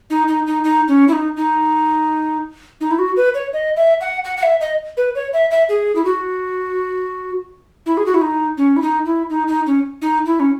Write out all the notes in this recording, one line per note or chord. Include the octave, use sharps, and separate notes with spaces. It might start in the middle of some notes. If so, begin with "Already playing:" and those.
D#4
D#4
D#4
D#4
C#4
E4
D#4
D#4
D#4
E4
F#4
B4
C#5
D#5
E5
F#5
F#5
F#5
E5
D#5
B4
C#5
E5
E5
G#4
E4
F#4
E4
G#4
F#4
E4
D#4
C#4
E4
D#4
E4
D#4
D#4
C#4
D#4
E4
C#4